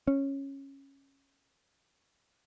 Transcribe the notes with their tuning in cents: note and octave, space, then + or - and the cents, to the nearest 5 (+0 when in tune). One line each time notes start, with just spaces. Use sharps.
C#4 -10